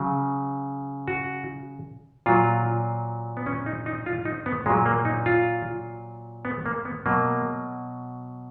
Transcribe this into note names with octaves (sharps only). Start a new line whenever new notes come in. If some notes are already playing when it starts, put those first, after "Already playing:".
Already playing: C#3 F#3
F#4
A#2 F#3 F4
B3
C#4
D#4
D#4
F4
D#4
B3
A#2 F#3 G#3
A#3
D#4
F4
B3
A#3
B3
B2 F#3 A#3